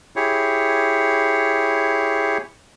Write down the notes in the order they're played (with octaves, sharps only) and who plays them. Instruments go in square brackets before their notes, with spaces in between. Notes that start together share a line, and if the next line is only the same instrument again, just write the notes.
[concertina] E4 G4 G#4 C#5